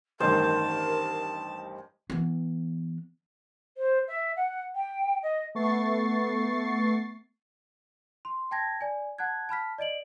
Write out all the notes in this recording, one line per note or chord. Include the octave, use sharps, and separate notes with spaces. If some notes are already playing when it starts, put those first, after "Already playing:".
A1 G2 D#3 A#4 C5 A5
E3 B3
C5
E5
F#5
G5
D#5
A3 B3 C#6 A6 C7
C6
G5 A5 G#6 A#6
D5 G#5
F#5 A5 F#6 G#6
A5 B5 F6 B6
D5 D#5 D7 F#7